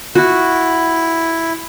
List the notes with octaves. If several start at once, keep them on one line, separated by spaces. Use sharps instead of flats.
E4 F#4